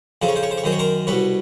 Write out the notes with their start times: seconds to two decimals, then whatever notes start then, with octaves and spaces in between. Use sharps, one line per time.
0.22 F2 C#3 F3 C5
0.28 C#5
0.36 C5
0.43 C#5
0.51 C5
0.57 C#5
0.64 F#2 D#3 C5
0.72 C#5
0.79 A#4 C5
1.07 C2 B2 B4 C#5